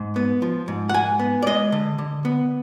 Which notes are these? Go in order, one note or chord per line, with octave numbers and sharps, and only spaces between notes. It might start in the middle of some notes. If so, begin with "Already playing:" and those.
Already playing: G#2
B3
F3
G#2
F#5
G#2 G#5
B3
D5
G#3 D#5
D3
D3
B3